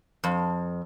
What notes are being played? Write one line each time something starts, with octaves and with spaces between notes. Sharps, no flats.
F2